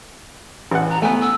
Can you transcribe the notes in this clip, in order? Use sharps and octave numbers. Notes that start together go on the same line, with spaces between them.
A1 B4 F#5
A#5
A3 B3 G#5
E6